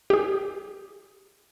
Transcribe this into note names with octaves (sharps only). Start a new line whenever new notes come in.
G4 G#4